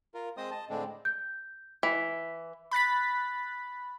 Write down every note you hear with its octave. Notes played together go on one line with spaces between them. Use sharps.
F4 A#4
G#3 C4 C5 D#5 D#6
D#5 A5
A2 D3 G#3 C4 D4
G6
E3 B6
B5 F#6 A6 B6